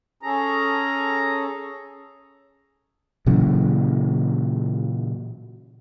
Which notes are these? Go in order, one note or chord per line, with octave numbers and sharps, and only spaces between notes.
C#4 G#4 A4 A#5
A#2 C#3 E3 F#3